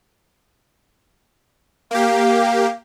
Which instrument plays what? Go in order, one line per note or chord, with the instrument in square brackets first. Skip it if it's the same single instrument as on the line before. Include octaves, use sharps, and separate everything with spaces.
[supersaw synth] A#3 G4 [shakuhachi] F5